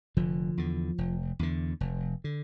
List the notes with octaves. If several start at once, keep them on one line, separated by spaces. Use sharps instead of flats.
F1 D3 F3
E2 D3
F1
E2 D3
F1
D3